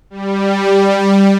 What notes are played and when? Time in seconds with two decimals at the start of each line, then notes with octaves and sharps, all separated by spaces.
0.10 G3